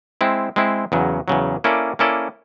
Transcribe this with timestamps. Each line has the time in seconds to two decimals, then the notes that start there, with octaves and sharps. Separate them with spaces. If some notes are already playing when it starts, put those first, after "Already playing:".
0.21 G#3 C4 E4
0.56 G#3 C4 E4
0.92 E2 C#3 F#3
1.28 E2 C#3 F#3
1.64 A#3 C#4 E4 A4 D5
1.99 A#3 C#4 E4 A4 D5